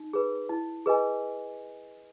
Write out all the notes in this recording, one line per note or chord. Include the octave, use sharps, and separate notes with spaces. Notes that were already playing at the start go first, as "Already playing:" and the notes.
Already playing: D#4
G#4 B4
E4
G#4 B4 D#5 G#5